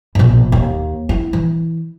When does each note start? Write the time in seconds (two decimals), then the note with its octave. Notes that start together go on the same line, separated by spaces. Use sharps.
0.15 A#1 B2
0.52 D#2
1.09 E4
1.33 E3